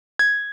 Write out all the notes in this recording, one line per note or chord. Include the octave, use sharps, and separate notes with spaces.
G#6